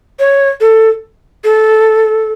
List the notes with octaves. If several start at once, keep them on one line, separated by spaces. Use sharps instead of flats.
C#5
A4
A4